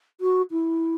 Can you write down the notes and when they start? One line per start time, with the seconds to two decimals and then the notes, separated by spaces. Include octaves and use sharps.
0.20 F#4
0.51 E4